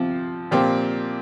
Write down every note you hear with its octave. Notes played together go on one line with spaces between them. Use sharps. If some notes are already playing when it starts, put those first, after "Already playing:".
Already playing: C3 F3 C4
A#2 F3 C4 G4